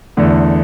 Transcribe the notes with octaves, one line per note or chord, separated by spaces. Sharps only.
E2 D3 A3